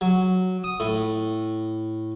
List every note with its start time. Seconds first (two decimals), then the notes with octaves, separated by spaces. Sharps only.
0.01 F#3
0.64 D#6
0.80 A2